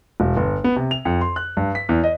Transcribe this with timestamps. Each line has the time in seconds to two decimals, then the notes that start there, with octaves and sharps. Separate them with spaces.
0.20 E1
0.37 G1
0.64 B3
0.76 C3
0.91 F7
1.05 F2
1.21 C6
1.36 F#6
1.57 G2
1.75 B6
1.89 E2
2.04 D#5